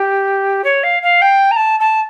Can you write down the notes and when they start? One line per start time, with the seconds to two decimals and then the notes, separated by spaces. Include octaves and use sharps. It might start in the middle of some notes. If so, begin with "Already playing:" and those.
Already playing: G4
0.64 C#5
0.83 F5
1.02 F5
1.21 G5
1.51 A#5
1.56 A5
1.80 A5